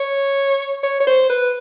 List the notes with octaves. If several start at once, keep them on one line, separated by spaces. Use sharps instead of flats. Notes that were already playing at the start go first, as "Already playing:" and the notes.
Already playing: C#5
C#5
C#5
C5
B4